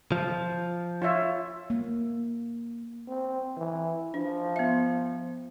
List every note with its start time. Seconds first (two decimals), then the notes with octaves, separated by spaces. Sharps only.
0.12 F3
1.02 F4 C#5 E5
1.70 A#3
3.08 C4
3.57 E3
4.14 F3 D4
4.56 B3 E5